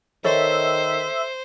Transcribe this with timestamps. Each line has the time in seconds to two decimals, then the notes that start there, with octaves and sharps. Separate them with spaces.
0.24 D#3 A4 C5 C#5 E5